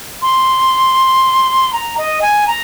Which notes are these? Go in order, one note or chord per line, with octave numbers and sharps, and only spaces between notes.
C6
A#5
D#5
G#5
A#5